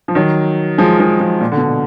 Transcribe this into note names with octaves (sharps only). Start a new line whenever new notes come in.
F3
D#3 F#3
F3 G#3
F3 G#3
F3 G#3
A#2
D3
B2